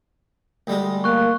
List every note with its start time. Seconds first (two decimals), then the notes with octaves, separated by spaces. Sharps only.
0.67 D2 G3 G#3
1.04 A#3 C#6 F#6